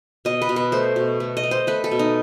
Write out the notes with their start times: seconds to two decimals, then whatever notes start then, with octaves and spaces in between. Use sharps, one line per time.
0.25 B2 D#5
0.42 B4
0.49 B2
0.56 B4
0.72 A3 C5
0.96 B2
1.20 A3
1.37 D#5
1.43 A3
1.51 C5
1.67 A3 B4
1.84 A4
1.91 B2
1.99 D#4